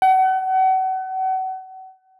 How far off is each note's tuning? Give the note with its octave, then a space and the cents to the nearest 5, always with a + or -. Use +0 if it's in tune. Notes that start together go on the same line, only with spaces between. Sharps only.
F#5 +35